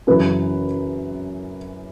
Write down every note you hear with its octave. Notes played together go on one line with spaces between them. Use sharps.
F#2 C#3 E3 B4